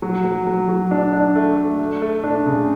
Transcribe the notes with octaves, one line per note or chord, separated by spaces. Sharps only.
F#3
F#3
F#3
F#3
D4
D4
A3
A3
A3
A3
D4
C#3